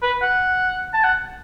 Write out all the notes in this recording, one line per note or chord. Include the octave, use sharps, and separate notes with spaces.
B4
F#5
A5
F#5